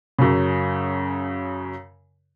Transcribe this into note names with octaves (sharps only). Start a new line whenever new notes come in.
F#2 C#3